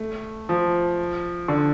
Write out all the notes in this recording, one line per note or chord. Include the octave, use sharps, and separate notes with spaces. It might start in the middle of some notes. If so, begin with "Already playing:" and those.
Already playing: A3
F3
D3